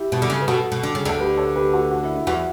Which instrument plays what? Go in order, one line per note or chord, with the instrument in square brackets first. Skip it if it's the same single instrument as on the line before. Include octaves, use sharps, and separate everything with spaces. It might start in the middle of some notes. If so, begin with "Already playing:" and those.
Already playing: [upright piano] E4 G4
[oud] B2
D3
C#3
[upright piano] B4
[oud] B2 [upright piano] F#4 A4
[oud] B2
D3
C#3
[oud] D2 D3 [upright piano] A4
[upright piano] G4 B4
A4 C#5
G4 B4
F#4 A4
F#4
E4
E4
[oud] E2 E3 [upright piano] F#4